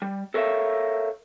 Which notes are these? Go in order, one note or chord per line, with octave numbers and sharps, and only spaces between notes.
G3
A4 A#4 C#5 D5 E5 F5